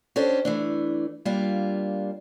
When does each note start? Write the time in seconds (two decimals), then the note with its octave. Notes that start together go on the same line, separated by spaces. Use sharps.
0.16 C#4 D4 G4 A4 C5
0.45 E3 A3 D4
1.25 G3 A#3 D4 F4